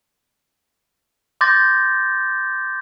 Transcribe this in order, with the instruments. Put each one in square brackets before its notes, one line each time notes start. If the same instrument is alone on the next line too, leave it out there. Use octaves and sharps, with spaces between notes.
[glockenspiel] C6 D6 G6 A6 A#6